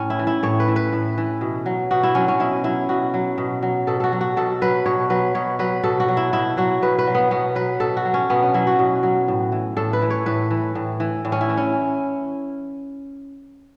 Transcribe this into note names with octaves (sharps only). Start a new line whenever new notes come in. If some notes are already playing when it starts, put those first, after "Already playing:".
Already playing: A2 C#4
E4
E3
E4
A2 C#5
B4
E3
B4
A2
E3
B2
F#3
B2 F#4
E4
F#3 C#4
C#4
B2 E4
F#3 E4
B2 F#4
F#3
B2
F#3
B2 A4
F#4 A4
F#3
F#4
B2 A4
F#3 B4
B2 C#5
F#3 B4
B2 C#5
F#3 B4
B2 A4
F#4
F#3
E4
B2 E4
F#3 F#4
B2 B4
B4
F#3
B3
B2 B3
F#3 B4
B2 A4
F#4
F#3
C#4
B2 B3
C#4
F#3 E4
F#4
B2
F#3
A2
E3
A2 A4
B4
E3
C#5
A2 B4
E3
A2
E3
A2
C#4
E4
E3
C#4